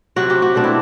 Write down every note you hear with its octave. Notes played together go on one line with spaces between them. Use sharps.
C3 F#3 C4 F#4
G4
F#4
B2 A3 C4 D4
E4